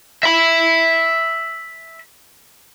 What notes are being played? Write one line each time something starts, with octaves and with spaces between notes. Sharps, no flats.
E5 B5